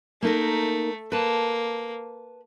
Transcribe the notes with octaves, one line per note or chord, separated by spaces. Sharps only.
A3 A#3 D#4 A#4
A#3 B4 A5